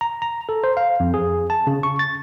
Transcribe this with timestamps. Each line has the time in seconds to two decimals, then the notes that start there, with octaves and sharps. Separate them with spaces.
0.01 A#5
0.22 A#5
0.49 A4
0.64 C5
0.77 F5
1.00 F2
1.14 G#4
1.50 A5
1.67 C#3
1.83 C#6
1.99 A6